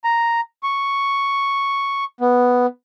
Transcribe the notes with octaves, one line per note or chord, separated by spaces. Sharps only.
A#5
C#6
B3